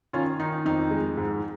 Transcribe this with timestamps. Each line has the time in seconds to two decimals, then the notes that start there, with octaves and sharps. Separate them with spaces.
0.13 D#3 C#4 F4
0.40 D#3 D#4
0.65 F2 D#4
0.91 G#3
1.17 G#2